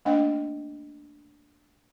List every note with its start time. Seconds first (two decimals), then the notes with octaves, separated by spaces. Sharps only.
0.05 A3 A#3 D4 D#5 G5